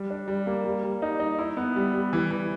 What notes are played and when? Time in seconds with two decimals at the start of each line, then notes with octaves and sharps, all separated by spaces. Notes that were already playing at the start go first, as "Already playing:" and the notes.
Already playing: G3
0.10 D4
0.28 G3
0.47 A#3
0.64 G3
0.83 G3
1.02 D#4
1.20 D#4
1.39 E4
1.57 B3
1.76 G3
1.94 G3
2.13 E3
2.31 E3